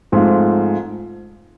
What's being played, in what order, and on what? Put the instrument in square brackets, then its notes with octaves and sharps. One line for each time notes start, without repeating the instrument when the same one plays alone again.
[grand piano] G#2 F3 A3 C4 F4